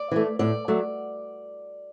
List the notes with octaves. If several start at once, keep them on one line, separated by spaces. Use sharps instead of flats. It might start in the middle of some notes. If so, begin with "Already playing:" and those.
Already playing: D5
E3 A3
A2 D5
F#3 A3